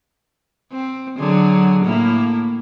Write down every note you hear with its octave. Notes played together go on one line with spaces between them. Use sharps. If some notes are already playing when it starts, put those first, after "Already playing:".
C4
D3 F#3 G#4
A2 A#3 E4